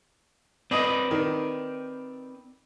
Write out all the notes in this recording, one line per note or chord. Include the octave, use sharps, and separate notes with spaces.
C4 B4 D5 D#5 D#6
D#3